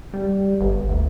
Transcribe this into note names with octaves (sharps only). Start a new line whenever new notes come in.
G3
G1
D2